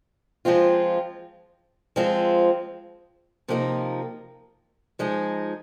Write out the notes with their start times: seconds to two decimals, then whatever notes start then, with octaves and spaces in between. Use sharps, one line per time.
0.45 F3 G#3 C4 F4
1.96 F3 G#3 C4 F4
3.48 C3 F3 A#3 D#4
4.99 F3 G#3 D#4